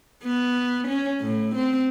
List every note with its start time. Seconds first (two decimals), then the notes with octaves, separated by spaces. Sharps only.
0.23 B3
0.88 C#4
1.21 A2
1.55 C4